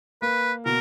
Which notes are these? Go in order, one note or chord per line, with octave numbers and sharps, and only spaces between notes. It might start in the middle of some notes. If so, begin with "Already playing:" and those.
A#3 B4
B2 A#4